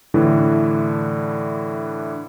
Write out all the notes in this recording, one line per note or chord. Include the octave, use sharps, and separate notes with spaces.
A2 D3 E3 D4 E4